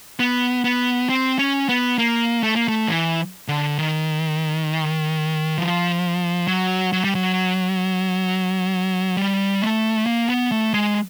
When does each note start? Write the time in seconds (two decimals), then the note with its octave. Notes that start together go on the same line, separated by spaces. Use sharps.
0.20 B3
0.64 B3
1.09 C4
1.39 C#4
1.69 B3
1.98 A#3
2.43 A3
2.56 A#3
2.68 A3
2.88 E3
3.48 D3
3.78 D#3
5.58 F3
6.47 F#3
6.93 F#3
7.04 G3
7.15 F#3
9.17 G3
9.61 A3
10.06 A#3
10.29 B3
10.52 A3
10.74 G#3